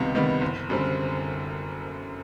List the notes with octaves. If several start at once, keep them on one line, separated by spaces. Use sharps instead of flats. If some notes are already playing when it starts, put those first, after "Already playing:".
Already playing: C#2 C3 D#3 G3 B3
C3 D#3 G3 B3
F#1
F#2 D3 G3 C4